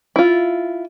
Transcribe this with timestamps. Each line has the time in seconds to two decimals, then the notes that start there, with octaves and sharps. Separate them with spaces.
0.16 E4 F4